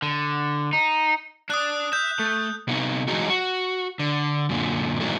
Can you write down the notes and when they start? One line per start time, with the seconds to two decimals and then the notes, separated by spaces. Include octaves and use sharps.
0.02 D3
0.73 D#4
1.50 D4 D5 D#6 F#6
1.93 E5 G6
2.19 A3
2.67 C3 B3 D#4
3.08 E3 F#3 G#3 D#4 F#4
3.29 F#4
3.99 D3
4.49 F#2 A#2 D3
5.00 G#2 B2 D#3 E3 F#3 A3